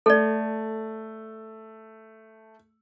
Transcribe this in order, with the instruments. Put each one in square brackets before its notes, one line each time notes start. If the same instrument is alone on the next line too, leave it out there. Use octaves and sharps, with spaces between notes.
[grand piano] A3 [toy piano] A4 D5